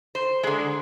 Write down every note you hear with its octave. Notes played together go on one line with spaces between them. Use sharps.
C5
D3 G#3 G#4